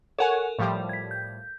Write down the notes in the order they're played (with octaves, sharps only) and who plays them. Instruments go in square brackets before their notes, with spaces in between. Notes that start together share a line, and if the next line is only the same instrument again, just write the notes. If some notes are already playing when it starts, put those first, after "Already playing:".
[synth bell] A4 A#4 [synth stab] C#5 F#5 G#5
[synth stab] A2 F3 G3
[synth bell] G#6 B6
G6